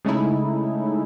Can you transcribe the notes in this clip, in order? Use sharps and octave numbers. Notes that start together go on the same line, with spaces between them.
C#3 G#3 A3 C#4 D#4 E4